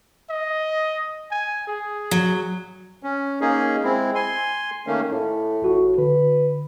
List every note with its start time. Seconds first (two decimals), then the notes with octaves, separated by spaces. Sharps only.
0.30 D#5
1.31 G#5
1.67 G#4
2.11 F#3
3.03 C#4
3.41 A#3 C#4 D#4 G#4
3.83 G#3 C4 E4
4.15 G#5 C6
4.87 D#3 A3 A#3 C#4
5.12 A2
5.62 A1 F#4 C#6
5.98 D3 B4